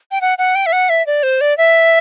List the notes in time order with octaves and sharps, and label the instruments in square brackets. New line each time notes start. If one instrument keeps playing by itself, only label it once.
[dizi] G5
F#5
F#5
G5
E5
F#5
E5
D5
C5
D5
E5